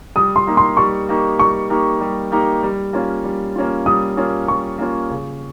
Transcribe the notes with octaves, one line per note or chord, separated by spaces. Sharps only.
G3 D#6
C6
A#3 D#4 G4 A#4
C6
G3 C#6
A#3 D#4 G4 A#4
G3 C#6
A#3 D#4 G4 A#4
G3
A#3 D#4 G4 A#4
G3
A#3 C#4 F4
G3
A#3 C#4 F4
G3 D#6
A#3 C#4 F4
G3 C#6
A#3 C#4 F4
C#3